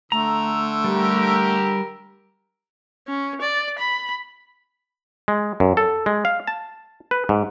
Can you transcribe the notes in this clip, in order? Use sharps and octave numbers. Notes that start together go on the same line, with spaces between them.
D3 A3 A#5 E6
G3 G4 A#4
C#4
D5
B5
G#3
F#2
A4
G#3
F5
A5
B4
G#2